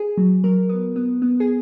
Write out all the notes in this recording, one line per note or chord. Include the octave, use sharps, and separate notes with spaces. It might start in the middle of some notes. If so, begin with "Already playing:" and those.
Already playing: G#4
F#3
F#3 A#4
B3
B3
B3
G#4